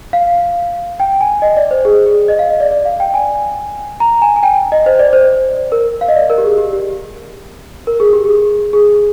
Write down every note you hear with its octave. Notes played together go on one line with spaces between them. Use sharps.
F5
G5
G#5
D#5
D5
C5
G#4
G#4
D#5
F5
D#5
D5
D5
F5
G5
G#5
A#5
G#5
G#5
G5
D#5
C5
D5
C5
A#4
F5
D#5
D5
A#4
G4
G#4
G4
G4
A#4
G#4
G4
G#4
G#4